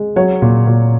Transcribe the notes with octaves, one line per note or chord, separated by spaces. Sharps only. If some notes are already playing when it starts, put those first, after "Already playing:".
Already playing: G#3
F#3 C#5
A#2
A#2